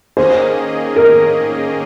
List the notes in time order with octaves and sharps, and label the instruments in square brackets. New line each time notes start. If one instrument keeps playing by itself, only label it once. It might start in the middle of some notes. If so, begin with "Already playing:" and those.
[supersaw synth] D#3 A#3 C#4 G#4 D#5 [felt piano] C5
[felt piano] A#4